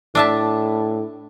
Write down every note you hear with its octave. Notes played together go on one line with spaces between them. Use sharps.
A2 D4 E5 A5